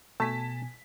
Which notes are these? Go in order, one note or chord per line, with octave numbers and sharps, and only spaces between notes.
B2 A3 G#5 A5 B6